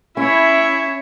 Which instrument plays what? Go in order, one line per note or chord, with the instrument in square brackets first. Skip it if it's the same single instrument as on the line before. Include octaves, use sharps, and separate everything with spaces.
[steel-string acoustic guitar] C#4 [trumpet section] E4 [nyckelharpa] C#5 E5